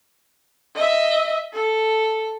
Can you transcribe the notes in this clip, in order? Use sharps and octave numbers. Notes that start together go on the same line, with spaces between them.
D#5 E5
A4